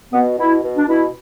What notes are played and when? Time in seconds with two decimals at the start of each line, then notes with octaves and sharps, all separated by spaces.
0.13 B2 B3
0.39 B2 E4
0.63 B2
0.77 D4
0.88 B2 E4